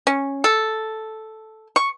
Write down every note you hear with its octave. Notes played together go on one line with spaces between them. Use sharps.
C#4
A4
C#6